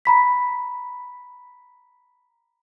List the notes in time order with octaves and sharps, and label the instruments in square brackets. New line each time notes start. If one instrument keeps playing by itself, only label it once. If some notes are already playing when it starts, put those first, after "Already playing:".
[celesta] A#5 B5 B6